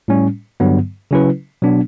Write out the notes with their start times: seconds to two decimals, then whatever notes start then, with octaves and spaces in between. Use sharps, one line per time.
0.08 A2 G3 C#4
0.60 G2 D3 F#3 B3
1.11 C#3 F#3 C#4 E4 B4
1.62 B2 F#3 B3 D4